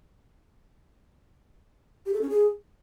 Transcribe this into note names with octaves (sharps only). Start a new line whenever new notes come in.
G4
A4
C#4
G#4